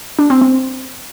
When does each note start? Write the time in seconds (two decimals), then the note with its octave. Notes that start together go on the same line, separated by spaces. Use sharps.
0.19 D4
0.30 C4
0.41 C4